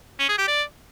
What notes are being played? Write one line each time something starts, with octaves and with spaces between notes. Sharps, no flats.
C#4
G#4
G4
D5